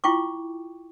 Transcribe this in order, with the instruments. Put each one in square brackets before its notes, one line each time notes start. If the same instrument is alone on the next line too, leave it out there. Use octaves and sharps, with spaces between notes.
[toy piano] E4 F4 G5 C#6 D6